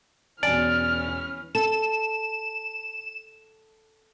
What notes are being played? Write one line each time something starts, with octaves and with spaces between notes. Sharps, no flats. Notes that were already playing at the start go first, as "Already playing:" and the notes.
E1 E3 C#4 D5 G#5 F6
A4 E7